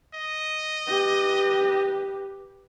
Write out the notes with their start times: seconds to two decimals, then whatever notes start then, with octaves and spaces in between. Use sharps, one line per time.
0.14 D#5
0.88 G4 B4